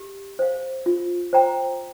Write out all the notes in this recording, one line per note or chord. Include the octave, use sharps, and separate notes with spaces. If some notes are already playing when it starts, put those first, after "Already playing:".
Already playing: G4
C5 F5
F4
C5 G5 A#5